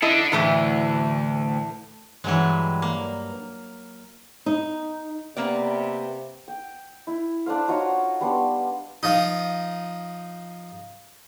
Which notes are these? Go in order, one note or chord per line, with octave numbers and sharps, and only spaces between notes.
D4 E4 A4 D#5
D2 A2 E3 A3
G2 E3 F#3 G#3
A#3
D#4
C3 A#3 B3 D5
G5
E4
D4 A4 C5 F5
D#4 F4 F#4 C#5
G3 B3 D4 C6
F3 D#4